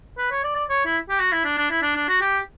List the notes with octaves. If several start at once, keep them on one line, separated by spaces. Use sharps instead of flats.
B4
C#5
D5
D5
C#5
E4
G4
F#4
E4
D4
D4
E4
D4
D4
F#4
G4